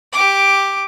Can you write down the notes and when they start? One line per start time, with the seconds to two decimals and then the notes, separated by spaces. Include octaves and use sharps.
0.12 G4 D6